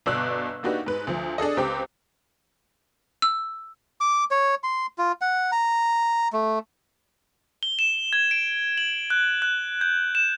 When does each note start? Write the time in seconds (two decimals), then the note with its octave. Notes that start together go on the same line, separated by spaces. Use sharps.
0.06 G1 B2 D5 E6 F#6
0.63 A#3 D4 D#4 F#4 G4 B4
0.86 G#2 B4
1.07 D2 F3
1.38 D4 G#4 A4 D#5
1.57 C#2 C4 G4 G5 D6
3.22 E6
4.01 D6
4.31 C#5
4.63 C6
4.98 F4
5.21 F#5
5.52 A#5
6.33 A3
7.63 G7
7.79 E7
8.13 G#6
8.31 D7
8.78 F#7
9.10 F#6
9.42 F#6
9.81 G6
10.15 E7